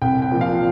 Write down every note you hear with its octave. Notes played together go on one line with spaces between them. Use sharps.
C2 G5
G5
A#2 F3
F5